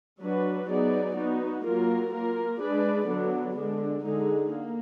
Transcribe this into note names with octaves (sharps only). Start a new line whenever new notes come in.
F#3 D4 F#4 B4
F#3 B3 D#4 G#4 D5
B3 D#4 F#4
F#3 A#3 F4 A#4
A#3 F4 A#4
G#3 D4 G#4 B4 D5
D3 F#3 B3 D4
D3 G#3 D4
D3 G#3 D#4 G#4
A#3